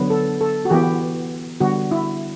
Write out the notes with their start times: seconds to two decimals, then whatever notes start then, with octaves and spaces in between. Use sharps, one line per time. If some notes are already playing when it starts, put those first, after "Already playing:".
Already playing: D3 F#3 B3
0.10 A4
0.41 A4
0.65 F#4
0.70 E3 B3 G4
1.60 D3 G3 B3 F#4
1.91 E4